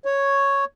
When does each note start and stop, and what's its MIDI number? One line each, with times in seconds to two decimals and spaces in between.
0.05 0.65 73